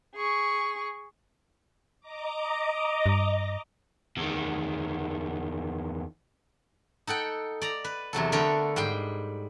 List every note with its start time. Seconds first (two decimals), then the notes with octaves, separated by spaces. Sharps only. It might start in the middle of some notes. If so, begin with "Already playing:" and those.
0.14 G#4 C#6
2.00 D#5 A#5 D6
3.06 G2
4.17 E2 D#3
7.07 D#4 A4 F#5 G5
7.62 D5 A#5
7.84 B4
8.13 E2 C3 F#3 A4
8.32 D3 A3 B3 A4 A#4 G5
8.76 G#2 G3 G5 C6